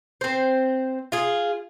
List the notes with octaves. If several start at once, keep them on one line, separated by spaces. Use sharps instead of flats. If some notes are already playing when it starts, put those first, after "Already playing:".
C4 C5
F4 G#4